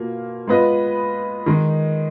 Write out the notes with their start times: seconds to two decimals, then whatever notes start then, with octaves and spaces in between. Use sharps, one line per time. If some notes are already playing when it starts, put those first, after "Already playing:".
Already playing: B2 A#3 F4
0.47 G#3 B3 F4 B4 D#5
1.46 D#3 G#3 D#4